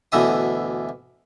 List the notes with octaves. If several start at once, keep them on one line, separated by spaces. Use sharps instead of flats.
D2 B2 E3 E5 D#6